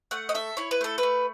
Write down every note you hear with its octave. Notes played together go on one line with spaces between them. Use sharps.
A3 F#5
D#5
A4 E5
E4 C#5
B4
A3 A4
B4
A3